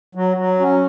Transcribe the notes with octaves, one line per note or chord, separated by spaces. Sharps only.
F#3
F#3
C#4